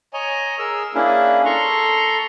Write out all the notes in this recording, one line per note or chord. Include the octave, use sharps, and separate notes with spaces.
C#5 D#5 G#5 A#5
G#4 A#4 E6
A#3 C#4 D4 E4 G#4
A4 A#5 C6 C#6